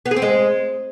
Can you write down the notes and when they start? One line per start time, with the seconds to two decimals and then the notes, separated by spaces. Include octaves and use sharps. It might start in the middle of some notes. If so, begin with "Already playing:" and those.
0.06 B3
0.11 G#4
0.17 C4
0.22 G#3